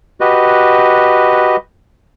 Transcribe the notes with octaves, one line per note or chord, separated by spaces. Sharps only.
F#4 G4 B4 D#5